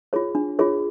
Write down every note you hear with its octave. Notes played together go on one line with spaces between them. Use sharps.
F4 G#4 C#5
D4
F4 G#4 C#5